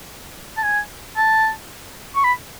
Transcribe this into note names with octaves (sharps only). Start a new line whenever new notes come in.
A5
G#5
A5
C#6
B5